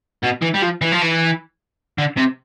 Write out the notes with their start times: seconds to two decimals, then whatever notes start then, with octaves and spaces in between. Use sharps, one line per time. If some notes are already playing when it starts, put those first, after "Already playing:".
0.24 B2
0.42 E3
0.54 G3
0.62 F3
0.81 E3
0.92 F3
1.01 E3
1.98 D3
2.17 C3